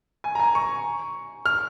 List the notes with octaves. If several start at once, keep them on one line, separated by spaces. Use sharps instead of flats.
G#5
A#5
G#5
C#6
F6